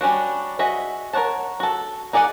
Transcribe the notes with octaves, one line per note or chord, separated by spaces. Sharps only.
G3 C#4 D4 F#4
F#4 G#4 D#5 E5
A#4 B4 C#5 F#5 A5
F#4 A4
D#4 G#4 D5 D#5 F#5